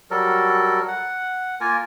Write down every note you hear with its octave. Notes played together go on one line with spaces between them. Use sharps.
F#3 G3 A4 A#4
F#5
A#3 F4 A#4 G#5